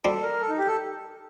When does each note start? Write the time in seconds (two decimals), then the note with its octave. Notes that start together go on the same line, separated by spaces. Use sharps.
0.05 G3 D4 F#4 A4 C5
0.23 A#4
0.41 A4
0.49 D#4
0.58 G4
0.67 A4